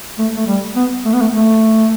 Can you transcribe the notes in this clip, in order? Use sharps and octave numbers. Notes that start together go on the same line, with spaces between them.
A3
A3
G3
B3
A3
B3
A3
A3